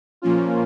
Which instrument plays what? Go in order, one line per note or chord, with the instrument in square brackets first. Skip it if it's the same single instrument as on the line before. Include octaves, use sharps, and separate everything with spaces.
[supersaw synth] A#2 F3 A#3 C#4 F4